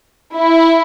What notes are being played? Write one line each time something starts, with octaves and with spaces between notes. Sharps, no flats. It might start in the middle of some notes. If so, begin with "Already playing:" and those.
E4